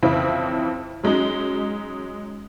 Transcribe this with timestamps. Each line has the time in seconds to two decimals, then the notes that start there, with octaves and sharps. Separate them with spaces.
0.03 F2 C#3 E3 C4 E4
1.03 F#3 G#3 C#4 D#4